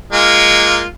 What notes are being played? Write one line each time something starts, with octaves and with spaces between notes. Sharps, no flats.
G#3 A#3 F4